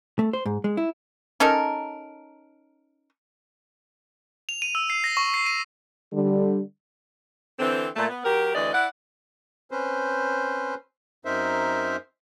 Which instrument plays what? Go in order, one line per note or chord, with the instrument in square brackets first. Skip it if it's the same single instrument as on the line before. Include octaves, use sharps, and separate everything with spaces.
[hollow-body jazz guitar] A3
C5
G#2
G#3
E4
[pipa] C#4 D#4 A4 A#4
[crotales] F7
D#7
E6
C7
A#6
C#6
C7
D#7
[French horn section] D3 G3
[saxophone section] D3 E3 C4
A#2 A3
B3
F#3 G4 A#4
D2 E3 G#4 D5 D#5
E4 D5 F#5
[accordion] C4 C#4 B4 C5
F#2 C4 D#4 A#4 C5 E5